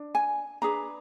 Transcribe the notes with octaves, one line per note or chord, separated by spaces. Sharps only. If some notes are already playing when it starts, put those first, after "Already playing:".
Already playing: D4
G#5
D4 G#4 B4 A#5